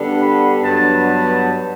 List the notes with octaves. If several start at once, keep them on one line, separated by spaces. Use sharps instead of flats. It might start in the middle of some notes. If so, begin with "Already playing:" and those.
Already playing: D3 G3 B3 D4
B5
G2 F#3 B3 D4 A5
A5